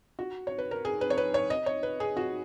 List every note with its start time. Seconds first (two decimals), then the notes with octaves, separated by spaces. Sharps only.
0.19 F#4
0.47 C#5
0.58 B4
0.71 A#4
0.85 G#4
1.01 B4
1.10 C#5
1.17 B4
1.34 C#5
1.50 D#5
1.66 C#5
1.83 B4
2.00 G#4
2.17 F#4